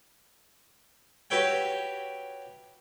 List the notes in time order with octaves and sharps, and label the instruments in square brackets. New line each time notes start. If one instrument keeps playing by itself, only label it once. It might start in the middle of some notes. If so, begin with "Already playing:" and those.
[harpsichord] F#4 G4 B4 C#5 E5 G5